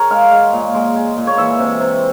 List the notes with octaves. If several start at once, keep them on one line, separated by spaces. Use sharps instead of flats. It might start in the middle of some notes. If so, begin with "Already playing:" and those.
Already playing: G#4 A#4 C#5
G#3 F5
G#3
A#2
G#3
G#3
A#2
C#5
E3 E5
C3
C3